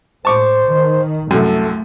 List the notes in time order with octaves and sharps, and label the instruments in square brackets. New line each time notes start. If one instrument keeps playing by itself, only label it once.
[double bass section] A2 [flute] C5 [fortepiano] A5 C#6 D6
[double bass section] D#3
[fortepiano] C2 F#2 [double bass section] A3 [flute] A4